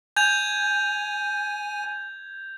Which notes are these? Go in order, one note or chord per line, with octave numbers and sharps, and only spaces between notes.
G#5 G6 G#6 F7